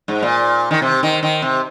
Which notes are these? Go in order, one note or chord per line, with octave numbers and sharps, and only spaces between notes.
G#2
A#2
D#3
C3
D#3
D#3
C3